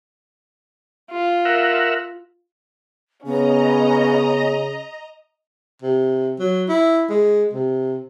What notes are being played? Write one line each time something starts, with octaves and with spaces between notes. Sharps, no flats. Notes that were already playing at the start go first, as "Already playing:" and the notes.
F4
A#4 E5 F#5
C#3 B3 C#4 D#5 A#5
C3
F#3
E4
G#3
C3